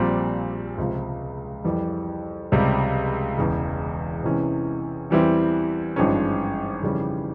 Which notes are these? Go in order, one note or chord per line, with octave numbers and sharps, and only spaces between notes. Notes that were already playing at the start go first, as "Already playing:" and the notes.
Already playing: A#1 A#2 G3 C4
C#2 C3 F3
F2 E3 G3
C#2 C3 G3
E1 E2 C#3
E2 C3 E3 G#3 C#4
E2 E3 G3 C4 E4
G#1 G2 F3 G#3 C#4
F2 C#3 E3 G3 C#4